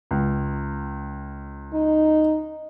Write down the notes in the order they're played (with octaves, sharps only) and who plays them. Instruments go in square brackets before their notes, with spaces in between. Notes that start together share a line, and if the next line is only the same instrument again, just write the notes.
[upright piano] C#2
[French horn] D#4